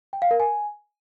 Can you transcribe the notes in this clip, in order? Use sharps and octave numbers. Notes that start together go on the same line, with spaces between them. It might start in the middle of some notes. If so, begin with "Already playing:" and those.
G5
F5
A#4
G#5